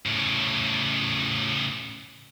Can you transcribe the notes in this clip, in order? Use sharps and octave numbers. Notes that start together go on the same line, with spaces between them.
A2 C#3